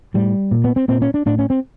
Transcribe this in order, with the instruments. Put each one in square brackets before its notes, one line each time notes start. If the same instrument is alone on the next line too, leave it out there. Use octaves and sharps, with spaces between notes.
[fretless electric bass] A2 G3
A#2
B3
C4
A#2 C4
C#4
D4
A2 D4
C#4
C4